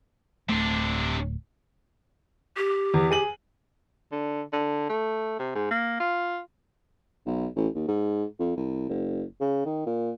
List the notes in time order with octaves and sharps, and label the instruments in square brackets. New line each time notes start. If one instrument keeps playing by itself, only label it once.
[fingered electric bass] D1 A3 [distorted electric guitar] C3 D4
[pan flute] G4
[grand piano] E2
G#4 D#7 F#7
[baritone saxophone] D3
D3
A3
C3
G#2
A#3
F4
[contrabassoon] B1
A1
D#2
G#2
F2
C2
F#1
C#3
D#3
A#2